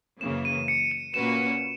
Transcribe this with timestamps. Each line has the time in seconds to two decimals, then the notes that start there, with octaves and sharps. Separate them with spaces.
0.21 F#2 C#3 E3 A#3 E7
0.45 D#7
0.68 C#7
0.91 D#7
1.14 A#2 A#3 C#4 F#4 B4 E7